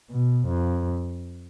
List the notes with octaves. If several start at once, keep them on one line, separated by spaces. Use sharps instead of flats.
B2
F2